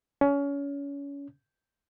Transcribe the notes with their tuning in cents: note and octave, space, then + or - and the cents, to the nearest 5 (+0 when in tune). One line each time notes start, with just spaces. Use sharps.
C#4 +30